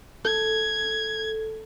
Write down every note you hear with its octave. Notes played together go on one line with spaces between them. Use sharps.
A4 G#6